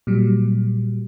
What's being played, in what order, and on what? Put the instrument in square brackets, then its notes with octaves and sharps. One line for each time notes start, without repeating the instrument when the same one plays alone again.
[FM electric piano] A#2 F#3 G3